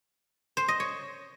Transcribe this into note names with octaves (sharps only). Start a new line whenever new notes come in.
C5
D#5
C#5